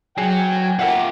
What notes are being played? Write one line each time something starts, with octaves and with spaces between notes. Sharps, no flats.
F#3 G#4 G5 G#5
A#3 F4 G4 E5 F#5